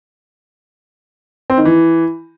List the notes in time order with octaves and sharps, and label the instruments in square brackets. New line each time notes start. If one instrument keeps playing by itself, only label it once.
[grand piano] C4
D#3
E3